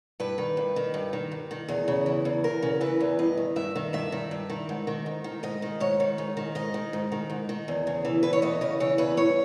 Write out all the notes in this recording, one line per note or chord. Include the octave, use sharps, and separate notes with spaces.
G2 B4
D#3
G2
D#3
G2
D#3
G2
D#3
E2 G#4
C#3
E3
E2
E2 A#4
C#3
E3 B4
E2
G2 D#5
D#3
G2 E5
D#3
G2 E5
D#3
G2
D#3
G#2
D#3
G#2
D#3
G#2 D#5
D#3
G#2 C#5
D#3
G#2
D#3
G#2 D#5
D#3
G#2
D#3
G#2
D#3
E2
C#3
E3
E2 B4
C#5
E2 D#5
C#3 D#5
E3 C#5
E2 B4
G2 C#5